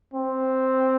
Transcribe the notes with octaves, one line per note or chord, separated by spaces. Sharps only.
C4